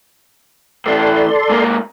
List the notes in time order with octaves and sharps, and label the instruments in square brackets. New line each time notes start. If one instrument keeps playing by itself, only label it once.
[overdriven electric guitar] A2 E3 [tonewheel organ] A4 D5 C6
[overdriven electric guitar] G#2 A#3